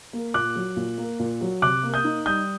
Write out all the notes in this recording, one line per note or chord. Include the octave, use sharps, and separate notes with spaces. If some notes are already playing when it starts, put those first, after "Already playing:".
A#3
A#2 D6 F#6
F#3
A#2
A#3
A#2
F#3
C3 D6 F#6
A#3
D#6 G6
D#4
G3 D#6 G6